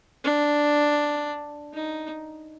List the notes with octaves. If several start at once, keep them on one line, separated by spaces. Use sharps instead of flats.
D4
D#4